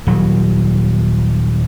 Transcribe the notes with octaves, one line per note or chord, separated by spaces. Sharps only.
D#1 F#3